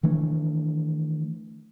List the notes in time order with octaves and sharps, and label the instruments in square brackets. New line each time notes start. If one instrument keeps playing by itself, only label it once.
[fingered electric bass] D#3 E3 A3 D4